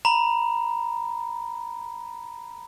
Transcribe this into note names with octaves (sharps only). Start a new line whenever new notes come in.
A#5 B5